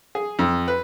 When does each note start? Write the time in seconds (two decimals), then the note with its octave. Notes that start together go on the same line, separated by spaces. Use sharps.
0.15 G#4
0.39 F2
0.68 B4